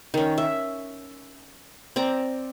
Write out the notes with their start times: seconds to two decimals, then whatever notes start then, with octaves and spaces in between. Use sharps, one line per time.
0.14 D#3 C#4
0.38 E5
1.96 C4 D5 A#5